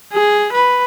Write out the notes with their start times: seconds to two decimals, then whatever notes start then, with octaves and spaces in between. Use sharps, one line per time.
0.13 G#4
0.53 B4